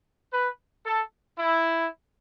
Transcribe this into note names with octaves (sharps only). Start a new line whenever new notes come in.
B4
A4
E4